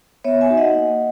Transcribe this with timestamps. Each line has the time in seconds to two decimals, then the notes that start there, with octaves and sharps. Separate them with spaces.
0.24 B3 C#5 E5
0.41 E5 G#5
0.50 D#4 F#4
0.57 D#5 F#5
0.75 A#3